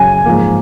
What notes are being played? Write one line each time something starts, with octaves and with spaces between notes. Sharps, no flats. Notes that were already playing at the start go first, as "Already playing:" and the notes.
Already playing: F#2 C#3 F#3 C#4 G#5
G#2 F3 A#3